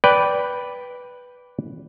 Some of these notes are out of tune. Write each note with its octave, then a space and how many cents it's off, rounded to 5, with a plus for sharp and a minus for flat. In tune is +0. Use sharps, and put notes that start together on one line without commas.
B4 +0 D5 -15 G5 +0